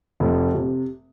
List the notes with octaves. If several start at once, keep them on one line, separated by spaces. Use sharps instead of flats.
F1
C3